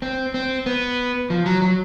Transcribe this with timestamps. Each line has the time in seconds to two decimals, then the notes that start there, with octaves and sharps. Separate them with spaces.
0.02 C4
0.34 C4
0.66 B3
1.30 F3
1.46 F#3
1.62 F#3